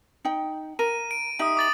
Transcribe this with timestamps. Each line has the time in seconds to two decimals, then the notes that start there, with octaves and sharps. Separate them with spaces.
0.25 D#4 G5
0.79 A#4 D#7
1.11 D7
1.39 D#4 G4 E5 D#6 D7
1.57 D6 A6 F#7